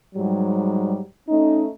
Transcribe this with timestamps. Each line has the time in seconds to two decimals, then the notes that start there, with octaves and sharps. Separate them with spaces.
0.15 G#2 F#3 G3
1.28 A3 C#4 D#4